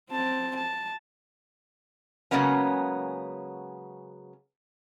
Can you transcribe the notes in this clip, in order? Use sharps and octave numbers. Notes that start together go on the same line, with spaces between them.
C4 A5
A5
C#3 F#3 G#3 A#3 B3 C#4